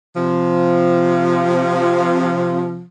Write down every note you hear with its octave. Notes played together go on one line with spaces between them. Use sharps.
C3 F3